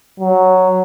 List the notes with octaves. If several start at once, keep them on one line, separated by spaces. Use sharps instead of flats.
F#3